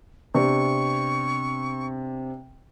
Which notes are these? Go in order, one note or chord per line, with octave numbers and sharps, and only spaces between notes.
C3 B3 D4 C#6